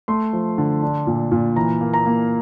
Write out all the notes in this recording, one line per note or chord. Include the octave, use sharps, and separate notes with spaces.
A3 C6
F3
D3
D4
A#2
A#2
E3 A#5
A#3
A#5
A#3